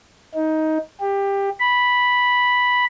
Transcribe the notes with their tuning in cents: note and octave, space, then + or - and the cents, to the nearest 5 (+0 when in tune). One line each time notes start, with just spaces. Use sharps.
D#4 +15
G4 +15
B5 -5